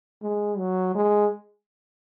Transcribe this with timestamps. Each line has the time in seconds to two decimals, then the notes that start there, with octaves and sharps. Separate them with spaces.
0.22 G#3
0.58 F#3
0.95 G#3